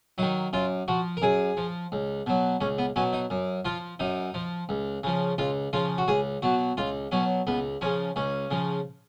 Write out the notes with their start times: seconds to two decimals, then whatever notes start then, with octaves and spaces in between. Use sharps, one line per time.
0.18 D#3 F#3 D#4
0.53 F#2 F4
0.88 F3 F#4
1.17 A#4
1.22 F#2 G#4
1.57 F3
1.92 C#2
2.26 B2 F#3
2.61 C#2 C#4
2.78 B3
2.96 B2 F#3 C#4
3.13 D#4
3.30 F#2
3.65 F3 F4
3.99 F#2 D#4
4.34 F3
4.69 C#2
5.03 C#3 F3
5.38 C#2 F4
5.73 C#3 F3 F4
5.98 F#4
6.08 C#2 G#4
6.42 B2 F#3 F#4
6.77 C#2 F4
7.12 B2 F#3 C#4
7.47 C#2 B3
7.81 C#3 F3 C#4
8.16 C#2 C#4
8.51 C#3 F3